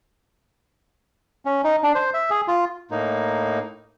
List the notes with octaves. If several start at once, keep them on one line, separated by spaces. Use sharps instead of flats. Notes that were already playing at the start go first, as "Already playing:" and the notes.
C#4
D#4
D4
C5
E5
G#4
F4
A2 A#3 D#4